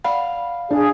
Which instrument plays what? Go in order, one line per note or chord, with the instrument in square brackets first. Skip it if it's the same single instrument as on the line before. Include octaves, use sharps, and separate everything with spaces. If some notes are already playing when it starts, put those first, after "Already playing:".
[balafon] D5 F#5 B5 [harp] F5
[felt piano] D4 [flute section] G#4